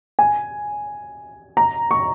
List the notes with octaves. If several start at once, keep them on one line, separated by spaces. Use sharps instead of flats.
G#5
A#5
C#6